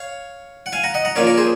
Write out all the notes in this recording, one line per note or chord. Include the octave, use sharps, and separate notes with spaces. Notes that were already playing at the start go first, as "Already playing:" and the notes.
Already playing: C#5 F5
F#5
F5 G#5
F#5 A#5
D#5 F#5
F#5 A#5
A#2 F3 A#3 C#4 C#5 F5
A#4 C#5
G#4 C5